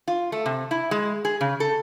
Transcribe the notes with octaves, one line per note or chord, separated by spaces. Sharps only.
F4
A3
C3
E4
G#3
G#4
C#3
A4